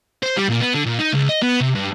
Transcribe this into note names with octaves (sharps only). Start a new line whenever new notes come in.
C5
G3
A#2
B3
D3
A#2
D#4
C#2
D#5
B3
C3
G2